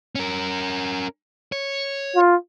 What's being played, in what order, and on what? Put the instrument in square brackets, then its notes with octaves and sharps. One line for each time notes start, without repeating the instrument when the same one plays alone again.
[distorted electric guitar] C#4 A#4
C#5
[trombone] F4